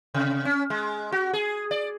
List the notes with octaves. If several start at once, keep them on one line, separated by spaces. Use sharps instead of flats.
C3
C#4
G#3
F#4
G#4
D5